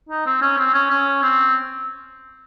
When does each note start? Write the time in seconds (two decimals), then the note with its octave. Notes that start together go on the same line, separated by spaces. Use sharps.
0.09 D#4
0.26 C4
0.41 C#4
0.58 C4
0.74 C#4
0.90 C#4
1.22 C4